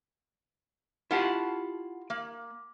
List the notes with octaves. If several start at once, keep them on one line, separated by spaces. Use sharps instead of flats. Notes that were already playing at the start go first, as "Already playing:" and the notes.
E4 F4 G4 F5 F#5 A5
A#3